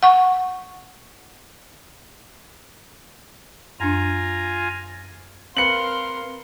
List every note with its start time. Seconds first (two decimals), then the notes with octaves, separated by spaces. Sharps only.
0.03 F#5 C#6
3.80 F#2 D4 F4 G#5 A#5
5.57 C4 A#4 B4 F5 C6 C#7 F#7